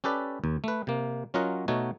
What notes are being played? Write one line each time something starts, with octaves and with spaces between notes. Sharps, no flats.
C#4 G4 A4 B4 D5
D#2
A3 B4
C3 A#3
F#3 C#4 F4 A#4 D#5 F#5
B2 A3 D#4 F#4 C#5